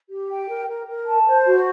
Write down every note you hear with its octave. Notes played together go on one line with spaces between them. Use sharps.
G4
G5
A#4
A#4
A#4
A5
C5
F#4